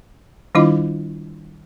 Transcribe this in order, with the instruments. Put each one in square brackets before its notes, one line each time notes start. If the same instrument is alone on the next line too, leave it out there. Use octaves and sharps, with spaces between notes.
[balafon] D#3 G3 D4 E4 F4 D#5